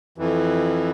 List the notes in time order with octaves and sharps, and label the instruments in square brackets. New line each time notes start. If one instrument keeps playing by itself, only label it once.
[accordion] F2 E3